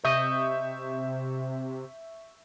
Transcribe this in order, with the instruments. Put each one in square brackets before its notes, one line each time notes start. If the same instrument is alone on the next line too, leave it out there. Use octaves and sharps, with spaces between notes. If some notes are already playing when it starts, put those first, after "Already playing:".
[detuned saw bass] C3 [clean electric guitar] D#5 [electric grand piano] E5 C#6 G6